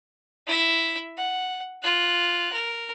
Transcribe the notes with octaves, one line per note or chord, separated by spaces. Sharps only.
E4 E5
F#5
F4 F#6
A#4